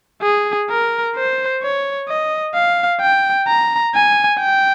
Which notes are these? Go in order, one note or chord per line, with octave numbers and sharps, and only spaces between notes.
G#4
A#4
C5
C#5
D#5
F5
G5
A#5
G#5
G5